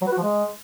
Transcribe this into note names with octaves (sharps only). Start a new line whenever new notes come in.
F#3
B4
F#4
F3
G#3